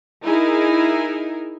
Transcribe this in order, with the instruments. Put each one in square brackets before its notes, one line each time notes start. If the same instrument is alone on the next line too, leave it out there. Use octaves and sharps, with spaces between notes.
[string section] D#4 E4 G#4 A#4